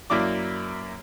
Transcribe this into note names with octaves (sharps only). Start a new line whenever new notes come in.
F#2 A#3 E4 D5 D6